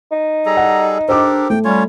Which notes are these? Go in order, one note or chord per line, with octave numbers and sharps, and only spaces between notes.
D#4
G3 G#4 A4 A#5
F#5
D4 G4 A4 A#4 C5 D6
A3 G5
G3 C#4 F4 C#5